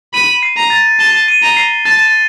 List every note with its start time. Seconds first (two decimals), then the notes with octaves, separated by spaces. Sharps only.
0.14 B5 D#7
0.43 C7
0.57 A#5
0.70 A6
1.00 A5 G7
1.28 D#7
1.43 A#5
1.57 C7
1.85 A5 A6